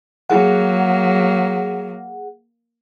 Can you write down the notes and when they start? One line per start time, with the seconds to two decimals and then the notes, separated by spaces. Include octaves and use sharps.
0.30 F#3 A#3 G#4 F#5